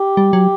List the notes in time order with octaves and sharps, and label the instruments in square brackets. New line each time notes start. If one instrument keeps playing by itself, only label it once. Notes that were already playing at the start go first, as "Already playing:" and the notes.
Already playing: [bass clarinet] G4
[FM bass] G3
F#3